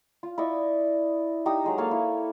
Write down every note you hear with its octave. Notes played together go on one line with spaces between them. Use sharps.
F4
E4 D5 D#5 C#6
D#4 G4 D#6 E6
F#3 G#3 D#5
A#3 A4 C#5 F5
E4